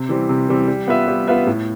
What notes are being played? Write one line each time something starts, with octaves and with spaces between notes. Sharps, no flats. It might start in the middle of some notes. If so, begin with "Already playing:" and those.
Already playing: C3
E3 G3 C4
C3
E3 G3 C4
G3
B3 F4 B4 E5
G3
B3 F4 B4 E5
A2